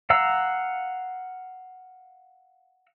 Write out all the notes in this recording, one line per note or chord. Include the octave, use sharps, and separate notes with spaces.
F5 F#5 A#5 E6